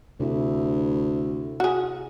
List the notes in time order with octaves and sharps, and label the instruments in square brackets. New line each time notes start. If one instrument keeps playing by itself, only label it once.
[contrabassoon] D2 [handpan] C3 E4
[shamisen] F#4 G#4